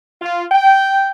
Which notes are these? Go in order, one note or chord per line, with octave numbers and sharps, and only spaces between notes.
F4
G5